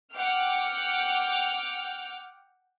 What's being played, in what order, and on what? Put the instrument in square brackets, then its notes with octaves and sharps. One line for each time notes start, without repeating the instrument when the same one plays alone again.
[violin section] F#5 G5 D6 F6